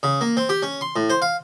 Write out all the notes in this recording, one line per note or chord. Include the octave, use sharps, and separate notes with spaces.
C#3
A#3
C4
G4
C#4
C6
A2
C5
F5